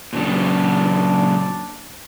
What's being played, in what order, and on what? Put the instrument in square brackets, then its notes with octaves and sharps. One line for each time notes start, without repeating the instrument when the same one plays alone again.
[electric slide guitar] A#2 C#3 F#3 [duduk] D4